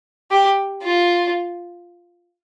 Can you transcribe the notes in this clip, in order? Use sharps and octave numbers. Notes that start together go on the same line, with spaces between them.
G4
F4